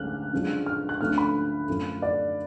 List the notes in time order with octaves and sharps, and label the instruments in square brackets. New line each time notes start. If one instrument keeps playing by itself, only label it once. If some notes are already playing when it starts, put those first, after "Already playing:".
Already playing: [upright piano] D2 D3 G#3 C#4 F6 F#6
C#3 F3 G#3 D4
F6
F#6
D2 D3 F3 A3 C#4 F6
B5
F#2 F3 A3
D5